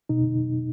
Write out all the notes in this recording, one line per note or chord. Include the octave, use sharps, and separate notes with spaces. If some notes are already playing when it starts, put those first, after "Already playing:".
B2 D#4